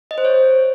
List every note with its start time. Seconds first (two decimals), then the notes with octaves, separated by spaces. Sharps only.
0.11 D#5
0.18 C5
0.25 C#5